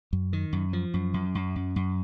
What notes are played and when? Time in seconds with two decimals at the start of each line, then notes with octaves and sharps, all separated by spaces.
0.13 F#2
0.33 D#3
0.53 F#2
0.73 F3
0.94 F#2
1.14 F#2
1.35 F#2
1.56 F#2
1.76 F#2